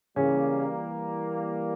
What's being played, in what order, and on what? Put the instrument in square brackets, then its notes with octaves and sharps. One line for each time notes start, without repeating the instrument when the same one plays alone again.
[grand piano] C#3 C#4 [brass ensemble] E3 G3 A#3